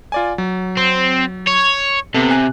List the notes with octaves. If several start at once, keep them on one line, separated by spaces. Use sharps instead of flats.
F4 D5 G#5
F#3
C4
C#5
C3 B3 A4
G#5 F#6